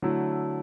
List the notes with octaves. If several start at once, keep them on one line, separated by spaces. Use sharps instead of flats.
D3 F#3 A3 E4